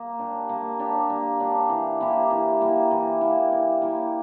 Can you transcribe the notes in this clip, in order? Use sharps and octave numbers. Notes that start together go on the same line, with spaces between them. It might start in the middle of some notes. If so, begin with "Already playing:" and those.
Already playing: A#3
D4 G4
A#3
D4 G4
A#3
D4 G4
E3
A#3 E4 G4
E3
A#3 E4 G4
E3
A#3 E4 G4
E3
A#3 E4 G4